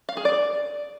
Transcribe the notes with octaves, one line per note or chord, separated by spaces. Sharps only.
F5
G#4
D5